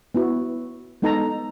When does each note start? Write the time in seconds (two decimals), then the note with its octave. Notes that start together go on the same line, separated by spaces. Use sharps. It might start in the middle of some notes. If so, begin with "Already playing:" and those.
0.15 B3 E4 F#4
1.02 G#3 B3 D#4 A4 A5 A#5